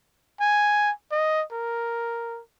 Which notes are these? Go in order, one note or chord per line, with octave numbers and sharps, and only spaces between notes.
G#5
D#5
A#4